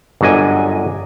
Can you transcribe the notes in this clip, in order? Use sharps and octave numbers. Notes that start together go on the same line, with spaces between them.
G1 F#2 D4 D#5 G#5